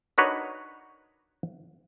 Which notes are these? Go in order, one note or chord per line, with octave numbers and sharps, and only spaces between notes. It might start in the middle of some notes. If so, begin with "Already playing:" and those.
D4 D#4 F#4 A#4 B4 C#5